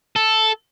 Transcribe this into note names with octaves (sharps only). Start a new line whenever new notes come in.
A4